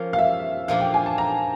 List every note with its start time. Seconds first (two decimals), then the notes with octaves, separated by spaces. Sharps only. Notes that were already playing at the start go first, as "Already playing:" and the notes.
Already playing: F3 A#3 C#4
0.13 F5
0.19 E5
0.68 A#2 F3 A#3 D4 F5
0.80 G5
0.94 G#5
1.06 A5
1.18 A#5